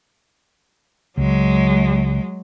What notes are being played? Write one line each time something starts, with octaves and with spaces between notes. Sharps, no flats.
C#2 F#3 G#3